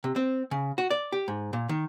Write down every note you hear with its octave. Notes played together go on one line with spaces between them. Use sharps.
C3
C4
C#3
F#4
D5
G4
G#2
A#2
D#3